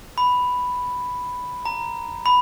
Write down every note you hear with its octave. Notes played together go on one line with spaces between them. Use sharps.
B5
A#5
B5